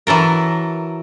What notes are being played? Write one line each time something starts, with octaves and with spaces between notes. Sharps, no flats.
E3 F#3 A4 A#4